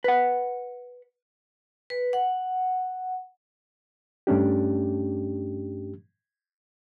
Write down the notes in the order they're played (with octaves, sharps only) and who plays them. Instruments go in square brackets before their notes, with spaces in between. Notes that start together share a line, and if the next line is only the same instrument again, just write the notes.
[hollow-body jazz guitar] B4 F#5
[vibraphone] B4
F#5
[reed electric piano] G2 A3 C#4 D4 G4